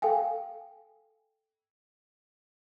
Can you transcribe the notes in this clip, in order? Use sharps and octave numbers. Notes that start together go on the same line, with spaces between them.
A4 F5 G5 G#5